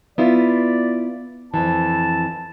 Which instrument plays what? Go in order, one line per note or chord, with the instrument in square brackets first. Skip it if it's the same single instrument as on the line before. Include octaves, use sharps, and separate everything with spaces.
[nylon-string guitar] B3 E4 F4 [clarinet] D5
[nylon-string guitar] F2 E3 [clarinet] A5